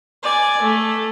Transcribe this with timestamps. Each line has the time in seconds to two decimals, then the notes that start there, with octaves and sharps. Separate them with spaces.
0.23 D5 G#5
0.62 A3